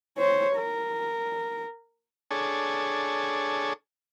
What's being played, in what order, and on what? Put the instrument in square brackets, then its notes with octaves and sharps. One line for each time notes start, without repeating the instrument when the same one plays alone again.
[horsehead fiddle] C5 C#5
A#4
[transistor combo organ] D4 G#4 A4 C#5